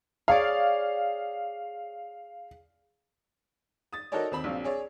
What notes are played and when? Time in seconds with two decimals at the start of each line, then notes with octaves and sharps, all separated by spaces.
0.28 G#4 C#5 D5 F5
3.93 D#6 A6
4.12 D#4 F#4 A4 A#4 C#5 D5
4.32 D#2 C4 B5
4.44 A#1 F#3 C4 F5
4.64 G#4 C#5 D5